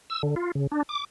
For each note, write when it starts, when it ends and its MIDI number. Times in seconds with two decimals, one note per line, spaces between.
0.10 0.22 88
0.23 0.35 50
0.36 0.51 65
0.55 0.67 49
0.72 0.83 62
0.89 1.05 86